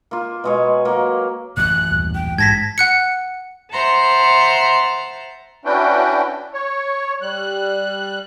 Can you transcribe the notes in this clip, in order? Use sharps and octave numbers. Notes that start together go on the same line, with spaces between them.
A#3 F4
B2 G#3 C#5
F#3 A#3
A1 F#2 F#6
D#1
G5
G#2 A5 G#6 A#6 B6
F#5 F#6 C#7
C5 E5 F#5 A5 A#5 C6
C#4 D4 E4 F#4 B4 G5
C#5
G3 F#6